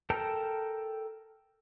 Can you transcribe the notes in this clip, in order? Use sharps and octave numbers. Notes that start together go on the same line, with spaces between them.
A4 A#4 G5 A5 A#5